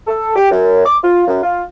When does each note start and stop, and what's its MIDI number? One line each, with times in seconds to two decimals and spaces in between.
0.07 0.33 69
0.35 0.46 67
0.50 0.82 42
0.85 0.96 86
1.03 1.22 65
1.27 1.39 42
1.42 1.63 65